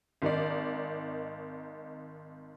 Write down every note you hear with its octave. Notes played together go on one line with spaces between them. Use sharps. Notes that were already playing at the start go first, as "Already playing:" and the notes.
G#1 D#3 D#4 D5